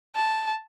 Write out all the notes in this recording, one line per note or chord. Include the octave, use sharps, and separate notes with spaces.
A5